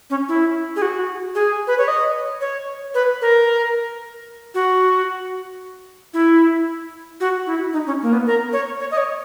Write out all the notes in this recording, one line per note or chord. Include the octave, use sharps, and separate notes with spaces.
C#4
E4
G#4
F#4
G#4
B4
C#5
D#5
C#5
B4
A#4
F#4
E4
F#4
E4
D#4
C#4
A#3
B3
A#4
C#5
C#5
D#5
C#5